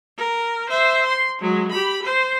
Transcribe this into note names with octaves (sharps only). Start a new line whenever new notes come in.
A#4
C5 E5
C6
F#3 G#3
G4 B5
C5